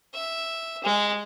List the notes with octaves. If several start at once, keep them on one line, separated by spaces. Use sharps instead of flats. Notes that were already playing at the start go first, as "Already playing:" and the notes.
E5
G#3